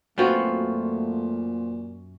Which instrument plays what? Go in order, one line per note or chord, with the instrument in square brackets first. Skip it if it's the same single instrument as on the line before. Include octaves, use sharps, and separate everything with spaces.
[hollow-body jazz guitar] F#2 F#4 [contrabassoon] A#2 [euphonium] A3 [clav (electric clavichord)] B3 C4 F4